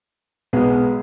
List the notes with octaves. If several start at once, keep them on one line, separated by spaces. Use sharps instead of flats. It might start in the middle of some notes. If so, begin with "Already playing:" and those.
B1 B2 G#3 B3